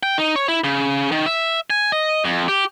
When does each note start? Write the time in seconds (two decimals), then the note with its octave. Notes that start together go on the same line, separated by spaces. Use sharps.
0.03 G5
0.18 D#4
0.36 C#5
0.48 E4
0.64 C#3
1.12 D#3
1.26 E5
1.70 G#5
1.92 D#5
2.24 F2
2.48 G4